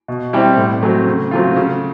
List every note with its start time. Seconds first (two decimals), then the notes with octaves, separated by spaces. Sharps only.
0.08 B2
0.33 G3 C4 E4 G4
0.57 A2
0.83 F#3 A3 C4
1.07 C#3
1.31 F#3 A3 C4 F4
1.56 C#3